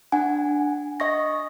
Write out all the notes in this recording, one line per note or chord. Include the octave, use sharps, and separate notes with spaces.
D4 F#5 G#5
D#5 C#6 A#6